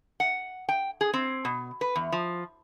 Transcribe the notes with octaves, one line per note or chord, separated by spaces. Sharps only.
F#5
G5
G#4
C4
B2
B4
E2
F3